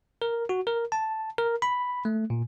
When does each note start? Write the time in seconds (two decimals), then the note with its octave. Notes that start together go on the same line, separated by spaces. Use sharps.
0.22 A#4
0.49 F#4
0.67 A#4
0.92 A5
1.38 A#4
1.62 B5
2.05 A3
2.30 A#2